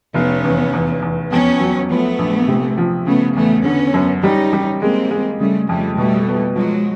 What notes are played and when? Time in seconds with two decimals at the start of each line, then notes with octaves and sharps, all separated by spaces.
0.14 F1 B3 C#4
0.44 E2
0.73 E2
1.02 E2
1.31 F2 B3 C#4
1.60 F#3
1.90 F3 A3 B3
2.19 A#1
2.48 C3
2.78 F3
3.06 C#3 A3 B3
3.36 E2 A3 B3
3.65 D3 B3 C#4
3.94 F#2
4.23 G3 C#4 D#4
4.53 G3
4.81 G#3 A#3 C4
5.11 G#3
5.40 C#3 G3 A3
5.69 F2 G3 A3
5.98 B2 G3 A3
6.28 B3
6.56 F3 F#3 G#3